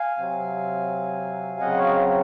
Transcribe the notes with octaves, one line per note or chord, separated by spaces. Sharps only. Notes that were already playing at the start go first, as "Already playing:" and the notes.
Already playing: F5 G#5
C3 F#3 C4
C#3 F#3 C4 D#5 F#5
C#5 F5